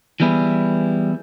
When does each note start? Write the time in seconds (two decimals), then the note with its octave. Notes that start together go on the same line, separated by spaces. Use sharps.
0.20 E3 G3 B3 E4 G#4